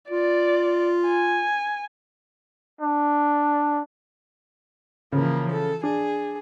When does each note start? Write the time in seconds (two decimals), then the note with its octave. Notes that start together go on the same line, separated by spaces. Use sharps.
0.10 F4 D5
1.08 G#5
2.81 D4
5.12 C#3 E3 F3 A#3
5.51 A4
5.83 D4 G#4